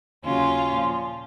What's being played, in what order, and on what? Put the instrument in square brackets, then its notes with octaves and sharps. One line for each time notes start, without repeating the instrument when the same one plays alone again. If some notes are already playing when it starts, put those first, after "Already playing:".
[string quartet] D#2 C#3 F#3 C#4 F4
A#2 F3